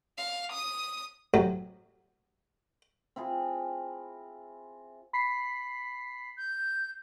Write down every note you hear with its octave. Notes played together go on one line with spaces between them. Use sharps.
F5
D#6
A2 C3 F#3
C4 E4 F4 G#4
B5 B6 C7
G6